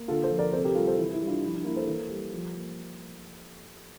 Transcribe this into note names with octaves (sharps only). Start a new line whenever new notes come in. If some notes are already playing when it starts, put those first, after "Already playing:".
Already playing: A#3
D3 F4 A4
A4 C5
F3
A#4 D5
C3 A4 C5
G4 A#4
G3 F4 A4
A4 C5
E3 E4
E4
G3
D4 F4
F3 E4
D4
A#3 E4
A4 C5
E3
G3
F3
A#3